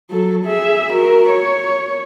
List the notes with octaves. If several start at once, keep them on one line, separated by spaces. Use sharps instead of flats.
F#3 A4
G#4 E5
F#4 A#4
C#5